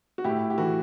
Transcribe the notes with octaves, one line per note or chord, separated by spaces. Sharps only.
F#4
A2 E4 G4
G4
E3 F#4 A4